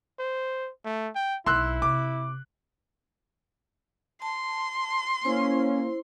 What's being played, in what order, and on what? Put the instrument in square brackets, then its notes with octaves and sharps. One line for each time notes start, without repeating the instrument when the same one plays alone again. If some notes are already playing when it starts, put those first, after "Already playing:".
[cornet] C5
A3
G5
[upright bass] B1 [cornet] E4 [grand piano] C6 E6 F#6
[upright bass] C3 [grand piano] D6
[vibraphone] A5 [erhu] C6
[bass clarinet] A#3 [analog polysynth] C#4 [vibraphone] E4 C5